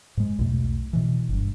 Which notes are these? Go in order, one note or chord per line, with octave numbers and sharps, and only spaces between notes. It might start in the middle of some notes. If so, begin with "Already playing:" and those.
G#2 G#3
B1 E2 B2 A3
B2 E3
G1 G2